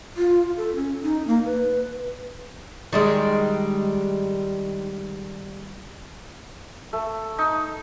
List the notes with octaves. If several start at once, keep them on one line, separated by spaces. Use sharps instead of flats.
F4
A4
C#4
D#4
A#3
B4
D#3 G3 G#3
A3
D#4